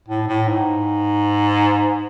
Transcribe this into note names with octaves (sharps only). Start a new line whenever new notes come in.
A2
A2
G#2